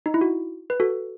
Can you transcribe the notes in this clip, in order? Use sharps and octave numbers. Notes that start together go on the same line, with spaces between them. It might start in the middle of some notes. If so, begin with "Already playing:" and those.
D#4
E4
F#4
B4
F#4 A4